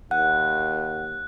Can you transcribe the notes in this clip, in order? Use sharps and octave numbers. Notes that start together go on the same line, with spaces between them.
D#2 F#5 F#6